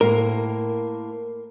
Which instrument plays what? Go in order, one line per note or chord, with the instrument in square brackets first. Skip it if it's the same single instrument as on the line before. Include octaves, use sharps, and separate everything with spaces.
[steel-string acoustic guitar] A2 A#3 C5 [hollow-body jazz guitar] A#4